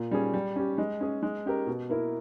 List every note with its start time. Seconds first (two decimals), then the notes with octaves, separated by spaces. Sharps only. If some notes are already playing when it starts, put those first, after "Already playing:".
Already playing: A#2
0.11 G3 C#4 G#4
0.34 G3
0.56 C#4 G4
0.78 G#3
1.00 C#4 G#4
1.22 G#3
1.46 C#4 G4 A#4
1.67 B2
1.90 A#3 E4 A#4